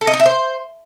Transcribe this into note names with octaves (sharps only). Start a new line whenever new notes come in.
A4
D#5
D#4
E5
C5